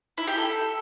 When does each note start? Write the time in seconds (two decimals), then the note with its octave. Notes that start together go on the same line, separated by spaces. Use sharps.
0.18 E4
0.28 G4
0.37 A4